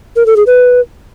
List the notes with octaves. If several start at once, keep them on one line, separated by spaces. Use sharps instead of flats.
A#4
A4
G#4
B4